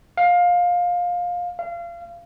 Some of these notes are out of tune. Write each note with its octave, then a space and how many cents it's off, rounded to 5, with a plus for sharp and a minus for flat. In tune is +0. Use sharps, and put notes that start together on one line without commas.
F5 +20
F5 -30